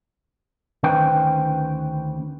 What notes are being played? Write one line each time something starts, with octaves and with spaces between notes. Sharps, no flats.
D2 D#3 C#4 B4 C5 G5